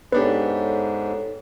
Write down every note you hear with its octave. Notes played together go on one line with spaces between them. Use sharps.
G#2 B3 D4 G4 A4 B4 C#5